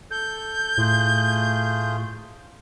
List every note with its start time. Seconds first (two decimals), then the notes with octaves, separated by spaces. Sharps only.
0.11 A4 G6
0.78 A2 A3 F4 G#4